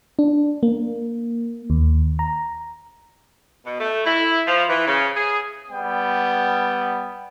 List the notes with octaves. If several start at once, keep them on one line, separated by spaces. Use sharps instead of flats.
D4
A#3
D#2
A#5
B2
A3
E4
F3
E3
C#3
G#4
G3 B3 G5